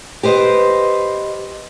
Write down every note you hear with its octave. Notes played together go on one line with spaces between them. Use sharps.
G4 B4 C5 D#5